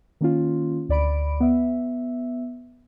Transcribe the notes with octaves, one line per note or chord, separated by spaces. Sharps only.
D#3 A#3 C#4 F4
D2 D5 B5 D7
B3 E5